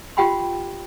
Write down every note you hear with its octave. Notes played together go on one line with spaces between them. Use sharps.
F4 G4 F#5 G5 B5 C6